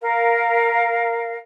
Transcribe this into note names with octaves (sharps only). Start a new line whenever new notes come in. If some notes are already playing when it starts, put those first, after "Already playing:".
A#4 F5